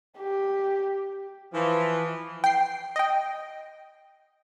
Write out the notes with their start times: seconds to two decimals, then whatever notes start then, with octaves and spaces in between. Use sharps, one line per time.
0.18 G4
1.54 E3 F3
2.44 G5 C7
2.96 D#5 G5